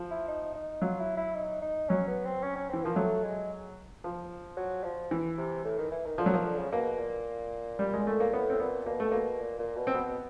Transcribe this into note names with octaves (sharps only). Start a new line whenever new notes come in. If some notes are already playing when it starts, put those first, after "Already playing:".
Already playing: F3
E4
D#4
D#4
F#3 F4
E4
E4
D#4
D#4
F#3 C#4
B3
C4
C#4
C#4
E3 C4
F3 A#3
F#3 A3
G#3
F3
F#3
F3
E3
C3
A2
D#3
E3
D#3
D3 F3
F#3
D#3 F3
D3
C#3
B2 A#3
A#2
G3
G#3
A3
A#3
A2 B3
C4
A#2 B3
B2 A#3
A3
B2 A#3
A#2
A#2
B2
C4
B2 B3